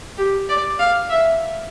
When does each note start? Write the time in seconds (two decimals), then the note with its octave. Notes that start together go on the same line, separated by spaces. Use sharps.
0.18 G4
0.49 D5
0.79 F5
1.10 E5